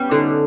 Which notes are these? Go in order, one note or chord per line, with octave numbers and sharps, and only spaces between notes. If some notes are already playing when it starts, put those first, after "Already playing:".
Already playing: G3 B3 C#4
D3 C#4 D#4